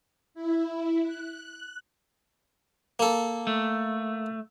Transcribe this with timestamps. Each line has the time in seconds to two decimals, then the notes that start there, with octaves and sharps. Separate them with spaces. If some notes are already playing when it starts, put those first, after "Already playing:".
0.34 E4
1.03 F#6
2.99 A#3 A4
3.47 A3